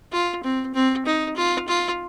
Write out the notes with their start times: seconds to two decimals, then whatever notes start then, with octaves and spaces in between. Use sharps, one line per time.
0.12 F4
0.43 C4
0.74 C4
1.06 D#4
1.36 F4
1.68 F4